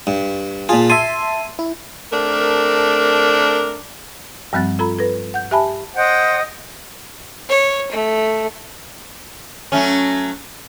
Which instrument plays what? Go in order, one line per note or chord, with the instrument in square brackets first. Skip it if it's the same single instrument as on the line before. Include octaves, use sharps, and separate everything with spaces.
[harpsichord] G2
[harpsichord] A#2 F4 [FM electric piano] G#4 A5
[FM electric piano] E5 A5 C6 [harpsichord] G#5
[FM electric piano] E4
[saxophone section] A3 C4 D4 A#4
[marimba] G2 F3 G3 C4 F#6 A6
F4 A4 A#5 B5
A4 B4
F#5 G6
G4 E5 G#5 A5 B5
[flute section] C5 D#5 F#5 G5
[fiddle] C#5
A3
[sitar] F#3 A3 C#4